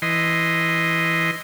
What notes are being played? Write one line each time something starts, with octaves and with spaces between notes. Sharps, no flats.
E3 D#5 C6